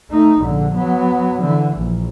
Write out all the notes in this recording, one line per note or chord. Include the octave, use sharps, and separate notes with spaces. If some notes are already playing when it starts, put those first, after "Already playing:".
A3 D#4
A#1 D3
F#3 B3
D3 E3
A#1